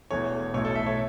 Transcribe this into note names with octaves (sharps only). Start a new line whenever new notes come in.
E1 E2 E3 A3 C#5
B1 A2 A3 C#5
A4
E5
C#5